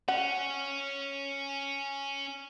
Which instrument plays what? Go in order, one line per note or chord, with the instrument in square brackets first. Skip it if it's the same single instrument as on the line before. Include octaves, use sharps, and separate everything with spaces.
[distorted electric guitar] C#4 [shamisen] F#5